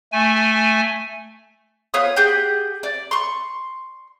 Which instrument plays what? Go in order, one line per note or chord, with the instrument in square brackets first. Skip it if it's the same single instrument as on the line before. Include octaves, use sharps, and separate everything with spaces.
[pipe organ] A3 G#5
[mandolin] B3 F4 C#5 D#6
G4 G#4 F#5 G5
D5
C6 C#6